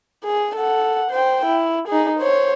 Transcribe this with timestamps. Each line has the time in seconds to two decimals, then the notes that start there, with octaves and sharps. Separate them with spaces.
0.24 G#4
0.56 A4 F#5
1.10 C5 G5
1.46 E4
1.88 D#4 G#4
2.19 C5 C#5